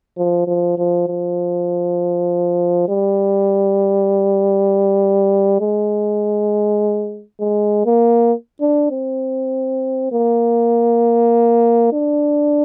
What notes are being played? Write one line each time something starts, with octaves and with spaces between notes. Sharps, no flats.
F3
F3
F3
F3
G3
G#3
G#3
A#3
D4
C4
A#3
D4